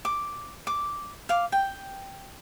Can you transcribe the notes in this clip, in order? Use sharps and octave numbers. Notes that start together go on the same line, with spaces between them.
D6
D6
F5 D6
G5